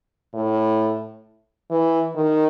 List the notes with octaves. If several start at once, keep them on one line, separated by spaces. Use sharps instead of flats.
A2
E3
D#3